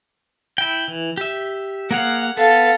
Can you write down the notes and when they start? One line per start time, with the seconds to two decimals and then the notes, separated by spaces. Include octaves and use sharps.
0.58 E4 G5
0.88 E3
1.17 G4 E5
1.91 A#3 G#4 F5 F#5
2.37 B3 A4 F5